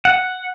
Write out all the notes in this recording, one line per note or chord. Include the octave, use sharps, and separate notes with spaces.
F#5